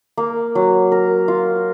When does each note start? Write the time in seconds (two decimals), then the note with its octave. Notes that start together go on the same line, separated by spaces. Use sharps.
0.17 A#3
0.55 F#3
0.92 A#4
1.28 F4